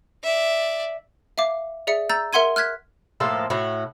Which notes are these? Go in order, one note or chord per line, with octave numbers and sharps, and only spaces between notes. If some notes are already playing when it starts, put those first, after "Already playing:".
D5 E5
E5 F5 D6
G#4 D5 E5 C#7
A#5 E6 G6 A6
A#4 E5 F#5 C6 G#6 D#7
F6 F#6 G#6 B6
A2 F3 A#3 A4
A2 F#4